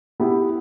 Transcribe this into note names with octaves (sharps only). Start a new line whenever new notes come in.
B3 E4 G4